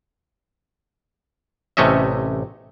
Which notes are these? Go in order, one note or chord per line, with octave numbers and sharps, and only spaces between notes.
A1 C3 A3 C#4 D#5 E5